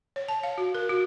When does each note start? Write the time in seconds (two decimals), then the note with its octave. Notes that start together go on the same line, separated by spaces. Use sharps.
0.16 C#5
0.28 A5
0.43 F5
0.58 F#4
0.75 A#4
0.89 F#4